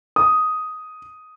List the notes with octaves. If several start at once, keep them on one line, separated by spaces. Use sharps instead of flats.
D#6